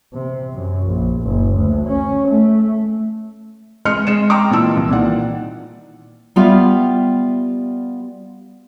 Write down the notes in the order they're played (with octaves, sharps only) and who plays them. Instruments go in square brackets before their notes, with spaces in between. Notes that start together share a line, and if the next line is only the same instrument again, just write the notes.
[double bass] C3
F#2
A#1
F#1
D2
C#4
A3
[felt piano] G#3 D#5 C6 F6 C#7
G#3 C#7 E7
D#5 G5 A#5 C6 D6
A#2 E3 A5 E6
C2
A#2 D#3 E3 D5 F#5
[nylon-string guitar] G3 B3 F4 G4 E5 F5